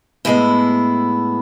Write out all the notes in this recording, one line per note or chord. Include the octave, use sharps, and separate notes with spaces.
A2 G#3 B3 E4